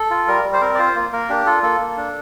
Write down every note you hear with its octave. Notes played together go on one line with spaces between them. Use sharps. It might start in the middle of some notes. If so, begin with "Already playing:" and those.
Already playing: A4
F4
G3 A#4
G3
C5
C4 A#4
D5
F4 C5
A#3
A#3 A#4
D4 G4
F4 A4
A#3 A4
A#3
D4